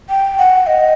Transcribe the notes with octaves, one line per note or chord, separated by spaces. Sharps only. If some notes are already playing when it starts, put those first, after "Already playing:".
G5
F#5
D#5